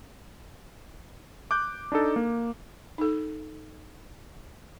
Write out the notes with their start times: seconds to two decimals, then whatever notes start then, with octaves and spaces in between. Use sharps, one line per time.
1.51 D6 F#6 G6
1.92 D4 D#4 A4
2.16 A#3
2.98 D#4 A4